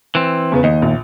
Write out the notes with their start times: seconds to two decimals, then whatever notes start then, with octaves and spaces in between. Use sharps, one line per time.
0.15 E3 C4
0.52 E2 C#3 B3
0.64 D#2 D#5
0.82 A#1